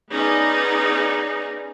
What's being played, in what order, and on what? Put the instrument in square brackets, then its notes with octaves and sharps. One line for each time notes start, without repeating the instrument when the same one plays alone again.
[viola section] B3 C#4 D#4 G#4 D5